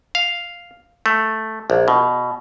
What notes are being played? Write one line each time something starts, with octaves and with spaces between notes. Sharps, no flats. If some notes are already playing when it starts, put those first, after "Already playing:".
F5
A3
A#1
B2